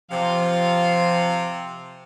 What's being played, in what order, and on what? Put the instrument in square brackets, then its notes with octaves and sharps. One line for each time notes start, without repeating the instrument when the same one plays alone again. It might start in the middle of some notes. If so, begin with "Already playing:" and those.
[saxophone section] C3 [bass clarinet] F3 [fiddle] F4 F5